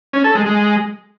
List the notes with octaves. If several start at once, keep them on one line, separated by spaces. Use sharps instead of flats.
C#4
A4
G#3
G#3